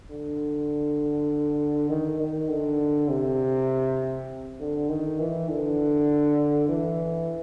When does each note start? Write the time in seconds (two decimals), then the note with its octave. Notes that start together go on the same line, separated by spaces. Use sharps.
0.10 D3
1.90 D#3
2.19 D#3
2.50 D3
3.10 C3
4.60 D3
4.89 D#3
5.19 E3
5.49 D3
6.68 E3